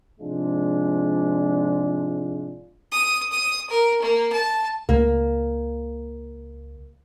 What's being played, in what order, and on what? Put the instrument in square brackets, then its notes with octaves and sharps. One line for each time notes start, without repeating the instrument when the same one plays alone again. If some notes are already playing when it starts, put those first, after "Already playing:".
[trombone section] G#2 C3 F3 G#3 D4 F4
[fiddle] D#6
D#6
A#4
A#3
A5
[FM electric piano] C#2 [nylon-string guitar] A#3